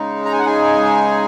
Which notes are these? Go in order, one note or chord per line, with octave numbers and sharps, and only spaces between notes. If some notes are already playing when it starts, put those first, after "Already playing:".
Already playing: C#3 G#3 D#4
A#5
G#5
F#5
G#4 G#5